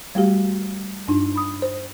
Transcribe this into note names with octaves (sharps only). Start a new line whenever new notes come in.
G3 A3 F#4 G4 F5
G2 D4 D#4
B5 D#6
C5